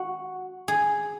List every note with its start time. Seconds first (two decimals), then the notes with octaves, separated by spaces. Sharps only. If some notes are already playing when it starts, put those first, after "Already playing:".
Already playing: F#4
0.68 G#4